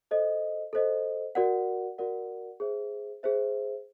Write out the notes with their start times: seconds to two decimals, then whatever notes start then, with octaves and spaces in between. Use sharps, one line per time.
0.11 A4 C5 D#5
0.73 A4 C5 D#5
1.35 F#4 A#4 D5 F#5
1.98 F#4 A#4 D5 F#5
2.60 G#4 C5 E5
3.23 G#4 C5 E5